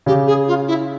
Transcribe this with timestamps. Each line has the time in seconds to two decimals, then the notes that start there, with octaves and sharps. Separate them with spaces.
0.06 C#3 G4
0.27 G#4
0.47 F4
0.67 E4